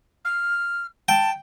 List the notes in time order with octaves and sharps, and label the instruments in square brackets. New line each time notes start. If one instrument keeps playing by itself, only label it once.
[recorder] F6
[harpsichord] G5 [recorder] A5